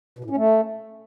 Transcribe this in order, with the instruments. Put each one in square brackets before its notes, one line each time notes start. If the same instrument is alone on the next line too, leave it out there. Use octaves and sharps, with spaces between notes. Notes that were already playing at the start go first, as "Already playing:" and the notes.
[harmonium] B2
A2
C#4
A3